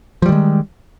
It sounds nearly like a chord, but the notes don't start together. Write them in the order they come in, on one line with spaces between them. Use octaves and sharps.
F3 G3 D#3 G#3